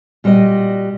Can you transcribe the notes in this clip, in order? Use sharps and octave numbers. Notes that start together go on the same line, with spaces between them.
A#2 G3 F#4 A#4 D#5